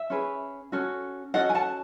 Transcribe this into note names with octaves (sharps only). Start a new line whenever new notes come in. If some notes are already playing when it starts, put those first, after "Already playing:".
Already playing: E5
C#4 G#4 B4
C#4 F#4 A4
C#4 F#4 A4 D#5 F#5
G#5
F#5 A5